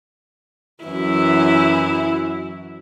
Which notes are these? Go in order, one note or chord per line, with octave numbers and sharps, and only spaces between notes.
F#2 E3 E4